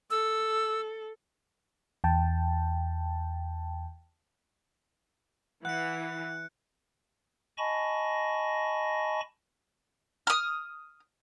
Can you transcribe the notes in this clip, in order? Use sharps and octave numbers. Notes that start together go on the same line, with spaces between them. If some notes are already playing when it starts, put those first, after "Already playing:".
A4 E6
E2 G5 A5
E3 F#5 F#6 C#7
D#5 G#5 A5 B5 C#6 A#6
D#6 F6